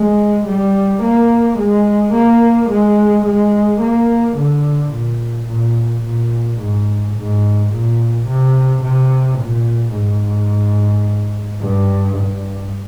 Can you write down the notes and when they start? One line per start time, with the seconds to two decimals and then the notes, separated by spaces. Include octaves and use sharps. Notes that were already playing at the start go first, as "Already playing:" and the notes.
Already playing: G#3
0.47 G3
1.03 A#3
1.58 G#3
2.14 A#3
2.69 G#3
3.25 G#3
3.81 A#3
4.37 D3
4.92 A#2
5.48 A#2
6.04 A#2
6.59 G#2
7.16 G#2
7.72 A#2
8.27 C3
8.82 C3
9.39 A#2
9.94 G#2
11.61 G2
12.17 G2